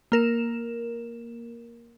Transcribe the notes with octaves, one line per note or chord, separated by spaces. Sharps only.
A#3 A#4 E7